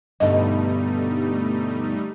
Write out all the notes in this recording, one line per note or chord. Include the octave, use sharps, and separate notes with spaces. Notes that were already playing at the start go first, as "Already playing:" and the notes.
G2 B2 D3 G3 A3 D#4 D#5